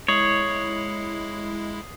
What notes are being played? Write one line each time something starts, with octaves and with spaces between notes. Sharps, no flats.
G#3 E4 C#5 D#6 C7 F#7